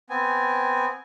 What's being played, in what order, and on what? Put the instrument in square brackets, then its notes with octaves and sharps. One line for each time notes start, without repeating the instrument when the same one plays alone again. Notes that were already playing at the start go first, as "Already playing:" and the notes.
[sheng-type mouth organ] B3 C4 G#5